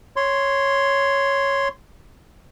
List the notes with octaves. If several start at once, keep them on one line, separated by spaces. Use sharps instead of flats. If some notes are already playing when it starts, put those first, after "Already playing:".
C#5 C6